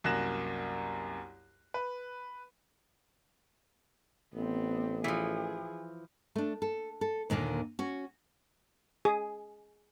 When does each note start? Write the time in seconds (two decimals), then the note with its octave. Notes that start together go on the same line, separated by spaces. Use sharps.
0.04 C2 F#2 A#3 F#6 A#6 E7
1.74 B4
4.34 A1 B3 C4
5.04 E3 F3 G#4
6.36 A3 D4
6.62 A4
7.01 A4
7.30 D#2 A#2 D3 A#3
7.79 C#4 F#4
9.05 G#4